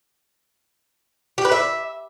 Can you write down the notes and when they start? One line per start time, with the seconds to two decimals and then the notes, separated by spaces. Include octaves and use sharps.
1.38 G4
1.45 B4
1.52 E5